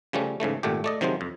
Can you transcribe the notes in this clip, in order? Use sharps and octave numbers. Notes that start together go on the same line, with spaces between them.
C#3 F3 G3 A3 C#4
G#2 C#3 E3 A3
G#1 A#2 A3 G4
A3 D5 D#5
C3 D#3 F3 F#3 G#3 C5
F2